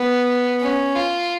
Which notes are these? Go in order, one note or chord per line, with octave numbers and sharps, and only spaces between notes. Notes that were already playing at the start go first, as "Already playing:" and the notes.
Already playing: B3
C#4
F4